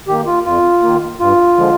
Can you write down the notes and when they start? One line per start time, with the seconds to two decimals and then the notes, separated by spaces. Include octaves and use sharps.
0.08 D#3 A#3 G4
0.26 F4
0.45 F2 F4
0.82 D#3 A#3
1.20 G2 F4
1.57 D3 F3 G#3